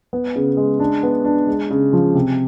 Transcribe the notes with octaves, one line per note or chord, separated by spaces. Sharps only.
B3
C#3
G#3
D4
B3
D4
G#3
C#3
F3
C3